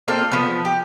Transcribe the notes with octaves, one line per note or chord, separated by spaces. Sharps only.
A#3 C4 F4 A4
F3 B3
G4